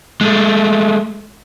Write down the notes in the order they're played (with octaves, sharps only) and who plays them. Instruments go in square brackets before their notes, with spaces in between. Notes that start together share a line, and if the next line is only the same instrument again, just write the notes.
[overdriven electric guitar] G#3 A3